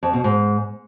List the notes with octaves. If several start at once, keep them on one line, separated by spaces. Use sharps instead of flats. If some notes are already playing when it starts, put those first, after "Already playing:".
F2
B2
G#2